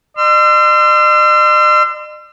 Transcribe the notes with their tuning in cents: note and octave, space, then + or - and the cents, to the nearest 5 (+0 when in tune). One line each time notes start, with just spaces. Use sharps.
D#5 -45 C6 -25 E6 +45